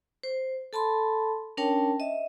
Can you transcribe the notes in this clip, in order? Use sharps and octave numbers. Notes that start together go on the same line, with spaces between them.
C5
A4 A5 B5 C6
C#4 D4 A#4 C#5 G5 A5
D#5 E5